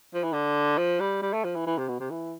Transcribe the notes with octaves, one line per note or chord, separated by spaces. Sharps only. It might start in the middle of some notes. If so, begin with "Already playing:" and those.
F3
E3
D3
F3
G3
G3
A3
F3
E3
E3
C3
B2
C3
E3